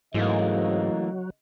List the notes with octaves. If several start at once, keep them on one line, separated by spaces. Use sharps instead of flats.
G#2 C#3 E3 F#3 A3 A#3 D#5